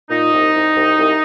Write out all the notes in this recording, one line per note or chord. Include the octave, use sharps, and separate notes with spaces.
A#2 D#4
C2
C2
C2
C2